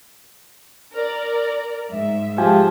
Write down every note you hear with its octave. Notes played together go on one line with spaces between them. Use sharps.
A#4 D5
G#2 E5
F3 G#3 G4 G#5